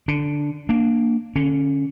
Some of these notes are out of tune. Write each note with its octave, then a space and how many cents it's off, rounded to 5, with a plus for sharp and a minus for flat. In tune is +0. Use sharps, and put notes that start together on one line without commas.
D3 +0 D4 -5
A#3 -5 D4 +0
D3 +0 C#4 +0